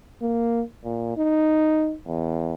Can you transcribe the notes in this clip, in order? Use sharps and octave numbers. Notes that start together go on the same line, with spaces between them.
A#3
A#2
D#4
E2